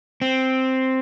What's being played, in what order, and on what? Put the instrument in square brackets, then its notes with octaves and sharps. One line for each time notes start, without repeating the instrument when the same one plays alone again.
[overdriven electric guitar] C4